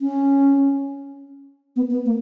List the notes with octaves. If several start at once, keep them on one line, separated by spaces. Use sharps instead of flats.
C#4
B3
B3
A#3